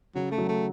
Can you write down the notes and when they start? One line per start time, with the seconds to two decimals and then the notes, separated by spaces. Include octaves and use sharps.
0.15 C#3 F#3
0.32 A3
0.38 F#3
0.49 A3